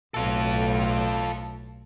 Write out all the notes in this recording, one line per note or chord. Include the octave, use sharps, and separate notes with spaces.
B1 A2 F4 A4